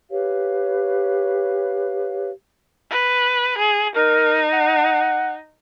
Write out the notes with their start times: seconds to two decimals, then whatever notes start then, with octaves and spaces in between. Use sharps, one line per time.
0.10 G4 B4 C#5 F5
2.91 B4
3.58 G#4
3.96 D#4 A#4
4.53 F#5